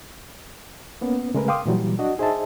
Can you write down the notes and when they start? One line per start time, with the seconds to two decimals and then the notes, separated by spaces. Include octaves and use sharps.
1.01 A#3 B3 C#4
1.35 C#3 G#3 A3 G#4 A#4 B4
1.48 F5 G5 C6 D6 D#6
1.66 A#2 E3 F#3 G3
1.99 D4 F#4 D#5
2.18 D#4 G#4 C5 D#5 E5 A5